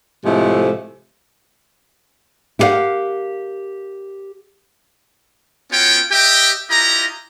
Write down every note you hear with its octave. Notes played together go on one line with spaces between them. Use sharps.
A2 C3 F3 G#3 A3
E4 G4 A#4 B4 F5 F#5
B3 C#4 F4 F#4 C#5 G5
G4 D#5 E5 G5
E4 F4 G4 D#5 A#5